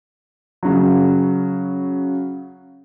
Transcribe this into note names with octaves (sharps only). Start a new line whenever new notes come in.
C#3 F#3